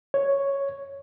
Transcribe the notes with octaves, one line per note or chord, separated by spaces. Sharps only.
C#5